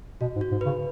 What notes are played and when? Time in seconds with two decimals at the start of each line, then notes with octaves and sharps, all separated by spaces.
0.21 B2 F#4
0.36 G#2
0.41 F#4
0.52 G#2
0.61 C#3 B4